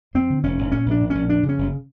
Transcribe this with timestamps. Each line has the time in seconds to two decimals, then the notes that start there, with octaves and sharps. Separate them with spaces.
0.14 F2 C4
0.30 D3
0.43 F1 C#4
0.58 F1
0.72 A#2 C#4
0.86 A#1 D4
1.01 A#2
1.10 A#1 C#4
1.29 F2 D4
1.43 C#3
1.49 C#4
1.58 F#1